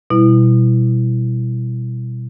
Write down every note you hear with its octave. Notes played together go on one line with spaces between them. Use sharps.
B2 G3 E4